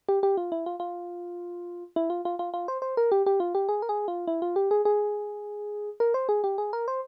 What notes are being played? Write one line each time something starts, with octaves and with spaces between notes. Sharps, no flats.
G4
G4
F4
E4
F4
F4
E4
F4
F4
F4
F4
C5
C5
A#4
G4
G4
F4
G4
G#4
A#4
G#4
F4
E4
F4
G4
G#4
G#4
A#4
C5
G#4
G4
G#4
A#4
C5